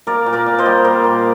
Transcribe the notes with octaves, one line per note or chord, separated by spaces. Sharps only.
A#3 A#4 D5
A#2
A#4 D5
A#2
C5 D#5
G3
A#3 A#4 D5
A#2